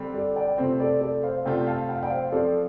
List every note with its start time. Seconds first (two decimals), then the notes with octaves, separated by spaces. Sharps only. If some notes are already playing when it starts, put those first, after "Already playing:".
Already playing: D3 G3 C4
0.14 A4 D5
0.36 D5 G5
0.58 C3 A3 C4 F4 C5
0.80 A4 D5
1.01 A4 D5
1.23 C5 F5
1.45 C3 A3 C4 F4 D5 G5
1.67 F5 A5
1.89 G5
1.96 F5
2.03 D5 G5
2.10 C5 F5
2.32 F3 C4 F4 A4 D5